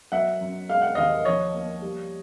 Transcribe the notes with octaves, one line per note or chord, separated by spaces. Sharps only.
F#3 E5 F#5
F#2
G#3 F5
F#5
D#2 D#5 F5
F3 C#5 D#5
A#3
G3